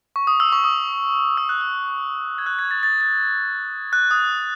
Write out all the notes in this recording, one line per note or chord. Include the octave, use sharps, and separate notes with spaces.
C#6
D#6
E6
C#6
D#6
E6
F#6
F#6
G#6
F#6
G#6
A6
A6
A6
F#6
D#6